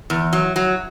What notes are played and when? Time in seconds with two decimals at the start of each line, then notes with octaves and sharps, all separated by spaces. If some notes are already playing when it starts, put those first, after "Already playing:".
0.10 E2
0.33 F#3
0.56 F#3